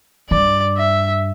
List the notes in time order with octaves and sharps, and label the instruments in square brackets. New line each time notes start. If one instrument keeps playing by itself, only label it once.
[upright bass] G2 [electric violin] D5
[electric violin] E5